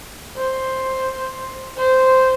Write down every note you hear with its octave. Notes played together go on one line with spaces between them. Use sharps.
C5
C5